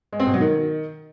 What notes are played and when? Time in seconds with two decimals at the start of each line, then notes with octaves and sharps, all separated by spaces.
0.13 G#3
0.20 C4
0.27 B2
0.34 F#3
0.41 D#3